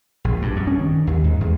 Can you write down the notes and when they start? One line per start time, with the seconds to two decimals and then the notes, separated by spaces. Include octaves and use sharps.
0.24 A#1
0.42 G2
0.56 F#2
0.67 C#4
0.79 D#3
1.07 D#2
1.24 G#2
1.41 E2